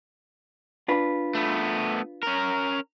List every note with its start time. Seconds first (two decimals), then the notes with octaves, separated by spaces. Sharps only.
0.88 D4 F4 B4
1.35 A3 B3
2.23 C#4 A#4